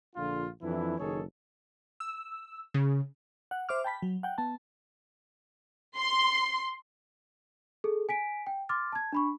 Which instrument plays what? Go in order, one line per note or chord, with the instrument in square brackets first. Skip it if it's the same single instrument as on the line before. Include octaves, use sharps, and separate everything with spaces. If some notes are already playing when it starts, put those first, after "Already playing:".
[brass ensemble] A#1 D3 F4
F2 E3 D4 E4
F#1 D#3 G#4 A4 C#5
[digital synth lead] E6
C#3
[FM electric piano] F#5
C5 E5 D6 F6
G5 A5 B5 B6
F#3
F#5 G5
B3 A5
[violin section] C6
[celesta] G#4 A4
G#5 B6 D7
G5
C6 D6 F6 A6
A5 G#6
D4 B5 C#6